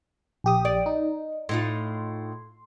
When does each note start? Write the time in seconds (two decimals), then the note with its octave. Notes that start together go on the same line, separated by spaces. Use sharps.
0.44 A#1 G4 D#6
0.65 D5
0.86 D#4
1.49 A2 D#4 F4 C6